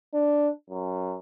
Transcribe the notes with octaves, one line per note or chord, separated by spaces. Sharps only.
D4
F#2